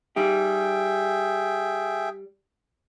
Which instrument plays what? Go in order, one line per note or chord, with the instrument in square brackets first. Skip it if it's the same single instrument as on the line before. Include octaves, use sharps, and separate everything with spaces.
[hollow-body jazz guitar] G3 D#4 G4 [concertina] G#4 E5 G5